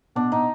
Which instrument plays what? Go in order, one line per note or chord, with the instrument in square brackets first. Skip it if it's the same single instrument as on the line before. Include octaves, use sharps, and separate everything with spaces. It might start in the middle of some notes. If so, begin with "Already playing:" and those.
[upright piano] B2 [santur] D4
[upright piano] B2 [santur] D#4